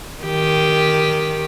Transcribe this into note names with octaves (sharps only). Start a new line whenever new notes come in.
D#3 G4